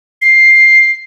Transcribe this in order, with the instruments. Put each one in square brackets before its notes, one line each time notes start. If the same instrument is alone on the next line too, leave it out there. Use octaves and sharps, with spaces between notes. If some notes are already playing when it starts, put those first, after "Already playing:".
[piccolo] C7